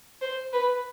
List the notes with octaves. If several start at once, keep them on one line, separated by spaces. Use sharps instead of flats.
C5
B4